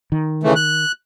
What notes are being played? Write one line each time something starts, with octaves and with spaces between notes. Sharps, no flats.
D#3
C#3 E3 A3
F#6